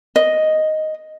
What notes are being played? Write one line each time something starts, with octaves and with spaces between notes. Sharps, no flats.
D#5